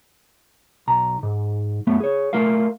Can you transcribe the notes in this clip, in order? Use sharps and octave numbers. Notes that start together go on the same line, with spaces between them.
B1 A#5
G#2
F#2 A3 B3
G#4 C#5
A3 F4 A#4 F5